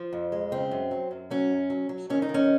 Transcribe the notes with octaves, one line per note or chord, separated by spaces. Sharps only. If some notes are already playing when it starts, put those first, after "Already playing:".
Already playing: F3
F2
G#3
C#3 C4
F#2
F#3
F#2
F#3 C#4
F#2
F#3
F#3
D#3 C#4
D#4
D#3
C#4